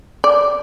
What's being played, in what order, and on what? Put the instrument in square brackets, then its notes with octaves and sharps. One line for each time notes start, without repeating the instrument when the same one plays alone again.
[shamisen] D5